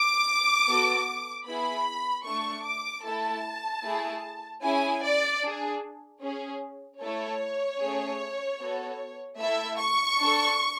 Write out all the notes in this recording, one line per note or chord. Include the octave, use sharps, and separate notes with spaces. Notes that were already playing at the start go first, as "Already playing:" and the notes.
Already playing: D6
B3 F#4 A4
B3 E4 G#4 B5
A3 D4 A4 C#6
D6
A3 E4 A4 A5
A3 E4 G#4
C#4 E4 G#4 G#5
D5
D4 G#4
C#4 G#4
A3 E4 A4 C#5
A3 C#4 G#4
B3 F#4 A4
A3 E4 A4 E5
C#6
D4 A4